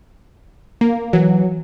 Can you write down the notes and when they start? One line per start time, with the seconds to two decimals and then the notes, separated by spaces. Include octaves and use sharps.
0.81 A#3
1.13 E3 F#3